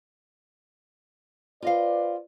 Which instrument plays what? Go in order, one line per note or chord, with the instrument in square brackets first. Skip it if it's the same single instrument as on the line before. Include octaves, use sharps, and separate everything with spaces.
[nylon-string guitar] F4 D#5 F5 [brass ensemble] B4 C5 D5